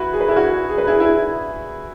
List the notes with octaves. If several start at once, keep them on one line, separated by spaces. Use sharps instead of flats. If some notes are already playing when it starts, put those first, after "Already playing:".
Already playing: E4 F#4 B4
G#4
B4
E4 G#4
F#4
G#4
B4
E4 G#4
E4 G#4